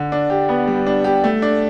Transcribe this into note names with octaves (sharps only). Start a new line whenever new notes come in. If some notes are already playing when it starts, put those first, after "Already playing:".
Already playing: D3
D4
G4
B3
G3
D4
G4
A3
D4